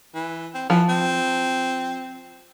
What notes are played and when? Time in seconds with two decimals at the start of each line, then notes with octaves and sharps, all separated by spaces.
0.15 E3
0.54 C4
0.70 E3 F3
0.89 C4